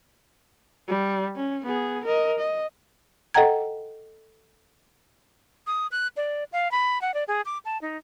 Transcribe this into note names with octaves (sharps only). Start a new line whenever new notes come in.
G3
C#4
B3 G#4
A#4 D#5
D#5
A4 D#5 F#5 G5 A#5 G#6
D#6
F#6
D5
F5
B5
F#5
D5
G#4
D6
A5
D#4